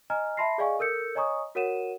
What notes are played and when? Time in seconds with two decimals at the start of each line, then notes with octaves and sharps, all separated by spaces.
0.10 D#5 G#5 A#5 F6
0.37 E5 A5 B5 C6 A#6 C7
0.58 G#4 D5 D#5 F5 G#5 C#6
0.79 A4 A#4 E6 G6 C#7
1.15 C#5 D#5 G#5 A#5 C#6 D#6
1.55 F#4 A#4 C#5 F#5 D#7 E7